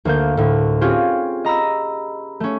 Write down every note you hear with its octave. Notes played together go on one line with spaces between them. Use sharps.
D2 A#3 G6
D2 A2
C4 C#4 F4 G4 G#4
D#5 A#5 B5 E6
A3 C#4